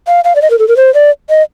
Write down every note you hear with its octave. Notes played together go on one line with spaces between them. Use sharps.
F5
F5
D5
D#5
A#4
A4
A#4
C5
D5
D#5